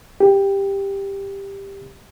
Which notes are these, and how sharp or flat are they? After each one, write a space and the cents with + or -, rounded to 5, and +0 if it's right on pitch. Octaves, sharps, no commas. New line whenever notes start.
G4 +10